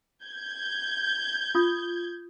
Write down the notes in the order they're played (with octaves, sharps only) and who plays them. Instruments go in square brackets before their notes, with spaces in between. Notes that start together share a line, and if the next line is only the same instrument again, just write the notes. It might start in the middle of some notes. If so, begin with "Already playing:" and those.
[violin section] G6 G#6
[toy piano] F4 D#6